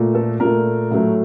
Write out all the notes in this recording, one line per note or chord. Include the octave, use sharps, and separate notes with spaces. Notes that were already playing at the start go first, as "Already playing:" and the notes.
Already playing: A#2 A3
A4
A#2 A3 A#4
A2 F#3 A3